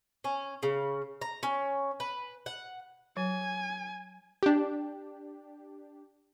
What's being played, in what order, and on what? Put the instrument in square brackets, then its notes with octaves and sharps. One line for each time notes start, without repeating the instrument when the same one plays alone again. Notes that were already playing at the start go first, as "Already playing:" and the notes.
[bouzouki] C#4
C#3
A#5
C#4
B4
F#5
[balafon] F#3 [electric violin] G#5
[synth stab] D4 G4